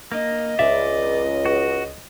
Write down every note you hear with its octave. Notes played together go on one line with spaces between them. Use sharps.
A#3 D#5
C#2 D5 E5
F#4